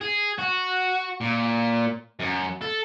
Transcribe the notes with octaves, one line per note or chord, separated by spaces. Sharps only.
G#4
F#4
A#2
F#2
A4